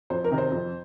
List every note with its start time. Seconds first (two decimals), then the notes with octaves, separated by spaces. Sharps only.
0.10 F2 C5
0.24 A#4
0.31 C3 D#3
0.38 C5
0.52 F2